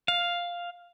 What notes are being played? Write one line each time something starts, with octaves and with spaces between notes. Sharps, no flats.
F5